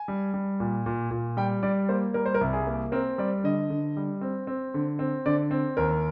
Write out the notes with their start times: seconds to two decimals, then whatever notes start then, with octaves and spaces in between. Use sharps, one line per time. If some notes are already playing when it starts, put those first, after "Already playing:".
Already playing: G#5
0.08 G3
0.34 G3
0.60 A#2
0.86 A#2
1.11 A#2
1.37 G3 G5
1.63 G3 D5
1.89 A#3 C5
2.14 G3 A#4
2.26 C5
2.34 A#4
2.41 C2
2.53 G#4
2.67 A#3
2.92 C4 A#4
3.18 G3 D5
3.44 D3 D#5
3.70 D3
3.97 G3
4.21 C4
4.47 C4
4.74 D3
4.99 C4
5.26 D3 D5
5.51 C4
5.77 D#2 A#4